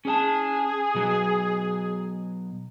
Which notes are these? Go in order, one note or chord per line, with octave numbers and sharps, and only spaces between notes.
C#4 D4 G#4 A5
B2 F#3